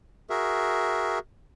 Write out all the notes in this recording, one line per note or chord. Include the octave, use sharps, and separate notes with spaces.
F#4 G#4 A#4 E5